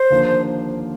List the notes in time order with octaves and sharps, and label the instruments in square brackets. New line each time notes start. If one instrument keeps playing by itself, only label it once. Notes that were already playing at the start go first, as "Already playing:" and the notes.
Already playing: [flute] C5
[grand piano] D#2 D3 F3 A#3 D4